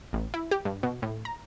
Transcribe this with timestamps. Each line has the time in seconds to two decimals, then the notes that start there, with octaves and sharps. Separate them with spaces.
0.13 A1
0.34 E4
0.51 G4
0.65 G2
0.83 B2
1.02 A2
1.25 A#5